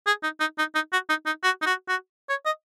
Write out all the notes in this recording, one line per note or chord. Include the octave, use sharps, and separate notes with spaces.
G#4
D#4
D#4
D#4
D#4
F#4
D#4
D#4
F#4
D#4
F#4
F#4
C#5
D#5